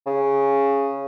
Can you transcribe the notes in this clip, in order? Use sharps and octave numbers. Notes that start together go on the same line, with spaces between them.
C#3